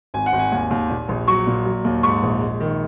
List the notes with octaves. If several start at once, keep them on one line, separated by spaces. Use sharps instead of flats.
G#1 G#5
F#5
G#1
G#5
D#2 G#5
D#2
A#2
A#1
F#3 C#6
A#2
F#3
D#2
G#2 C#6
A#1
G#3
D#3